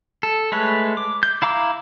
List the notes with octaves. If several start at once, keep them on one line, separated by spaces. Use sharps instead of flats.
A4
G#3 A3 B4 C#5
D6
G6
E4 F5 A#5 D6 E6